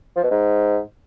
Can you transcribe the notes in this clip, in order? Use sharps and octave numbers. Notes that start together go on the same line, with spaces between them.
F3
B2
G#2